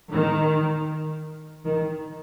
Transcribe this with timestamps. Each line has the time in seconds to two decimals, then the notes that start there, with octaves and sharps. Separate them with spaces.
0.11 D#3
1.64 D#3